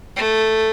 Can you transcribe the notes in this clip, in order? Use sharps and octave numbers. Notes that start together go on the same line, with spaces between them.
A3